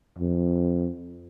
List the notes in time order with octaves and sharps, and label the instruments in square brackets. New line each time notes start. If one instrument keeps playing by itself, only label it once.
[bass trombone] F2